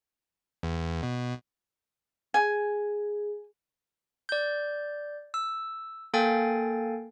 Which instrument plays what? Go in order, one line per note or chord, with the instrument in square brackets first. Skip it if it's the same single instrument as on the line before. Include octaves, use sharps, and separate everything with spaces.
[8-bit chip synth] E2
B2
[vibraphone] G#4 [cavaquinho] G#5
[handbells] D5 G6
E6
A#3 A4 F5 G5 G#5 A6